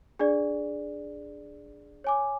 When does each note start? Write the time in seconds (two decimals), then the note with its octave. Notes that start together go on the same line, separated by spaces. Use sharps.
0.19 D4 G#4 D5
2.04 C#5 G#5 D6